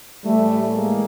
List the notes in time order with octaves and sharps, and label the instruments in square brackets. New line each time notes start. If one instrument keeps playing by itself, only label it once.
[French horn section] A2 E3 G3 A3
G#3 A#3